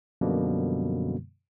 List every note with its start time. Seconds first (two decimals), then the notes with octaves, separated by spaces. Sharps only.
0.21 F#2 B2 D3 F3 G3 A#3